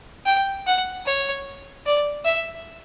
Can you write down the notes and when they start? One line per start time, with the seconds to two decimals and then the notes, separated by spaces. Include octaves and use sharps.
0.26 G5
0.67 F#5
1.06 C#5
1.86 D5
2.25 E5